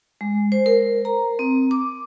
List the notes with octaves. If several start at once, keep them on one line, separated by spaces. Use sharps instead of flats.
G#3
C5
A#4
A#5
C4
D6